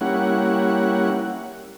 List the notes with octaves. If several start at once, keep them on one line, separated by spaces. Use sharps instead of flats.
G3 A#3 C#4 E4 F#5